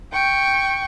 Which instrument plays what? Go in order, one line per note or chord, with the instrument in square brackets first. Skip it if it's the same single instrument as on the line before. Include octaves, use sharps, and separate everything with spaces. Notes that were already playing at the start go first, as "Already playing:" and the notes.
[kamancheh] G5 C#6